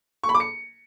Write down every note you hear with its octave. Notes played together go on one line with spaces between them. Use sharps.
C#6
B5
D6
C#7